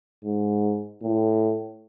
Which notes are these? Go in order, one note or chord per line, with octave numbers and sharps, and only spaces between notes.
G#2
A2